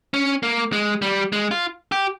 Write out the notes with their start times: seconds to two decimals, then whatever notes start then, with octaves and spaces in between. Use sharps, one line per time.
0.14 C#4
0.43 A#3
0.73 G#3
1.02 G3
1.32 G#3
1.51 F4
1.92 G4